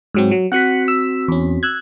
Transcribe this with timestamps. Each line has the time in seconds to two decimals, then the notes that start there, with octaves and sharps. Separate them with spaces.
0.14 G#2 F#3 C4
0.31 F#3
0.52 C4 F#4 F#5 F#6 B6 C#7
0.88 E6
1.28 E2 C#4
1.63 E6 F#6 G#6